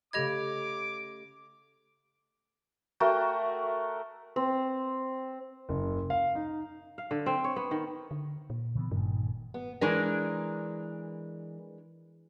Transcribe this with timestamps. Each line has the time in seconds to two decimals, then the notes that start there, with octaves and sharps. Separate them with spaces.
0.13 C#3 A3 G4 D#5 B5 D6 G#6
3.00 A3 F#4 A#4 G5
4.36 C4
5.69 F#1
6.10 F5
6.35 D#4
6.98 F5
7.11 D3
7.26 C4
7.44 C#5
7.56 B3
7.71 D#3
8.11 D3
8.50 A#2
8.75 C#3 E3 B3
8.91 G1 G2 A#2 D#3
9.54 B3
9.81 E3 G#3 D4 A#4